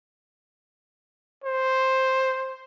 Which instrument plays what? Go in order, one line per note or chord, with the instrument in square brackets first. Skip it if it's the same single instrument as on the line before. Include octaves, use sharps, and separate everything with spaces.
[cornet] C5